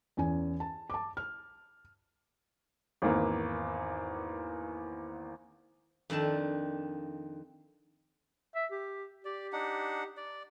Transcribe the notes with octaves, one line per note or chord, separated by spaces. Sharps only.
E2 C#4 G#5
A5
A5 D6
F6
G#1 E2 A#3
F2 D#3 D4 A5
E5
G4
G4 D5
D4 D#4 F#5
D5